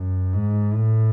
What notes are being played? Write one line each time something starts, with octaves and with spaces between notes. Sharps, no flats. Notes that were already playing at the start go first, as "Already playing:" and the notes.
Already playing: F#2
G#2
A2